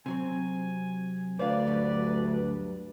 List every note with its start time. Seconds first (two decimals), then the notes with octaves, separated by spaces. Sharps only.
0.06 C3 F#3 C4 G#5
1.39 D2 B4 C5 D5 F5
1.67 G2 F#3 G3